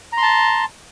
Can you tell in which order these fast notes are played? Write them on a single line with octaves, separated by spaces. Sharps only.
A#5 C6 A5